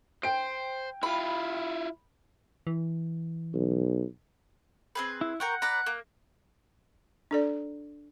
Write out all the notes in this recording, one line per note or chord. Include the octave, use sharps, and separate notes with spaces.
C5 G5 D7
E4 F4 B5
E3
B1
C4 G#4 B4
E4
A#4 F#5 G5 C#6
B4 D5 A#5 F#6
A#3
D4 A4 D5